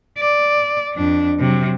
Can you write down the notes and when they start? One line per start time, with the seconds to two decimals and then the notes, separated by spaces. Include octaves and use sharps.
0.18 D5
0.93 F2 D4
1.39 C3 F#3